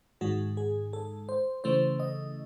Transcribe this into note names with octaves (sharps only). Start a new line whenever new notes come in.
G#2 D#3 G#3 F#4
G#4
A4
C5
C#3 E3 A3 C5
D#5